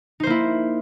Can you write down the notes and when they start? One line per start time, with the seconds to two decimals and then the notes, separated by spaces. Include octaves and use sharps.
0.20 D#4
0.23 C5
0.27 A#3
0.30 E4